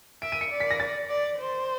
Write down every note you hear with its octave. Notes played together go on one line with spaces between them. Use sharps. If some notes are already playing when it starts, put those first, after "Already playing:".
E5 D7
D#7
C#7
D5
B6
A#6
A6
D5
C5